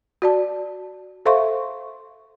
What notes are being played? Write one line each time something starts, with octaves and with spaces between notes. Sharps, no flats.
F#4 D5 A5
A4 C5 E5 F5 C6 C#6